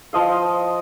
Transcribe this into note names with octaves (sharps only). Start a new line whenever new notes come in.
F3 D#5 F5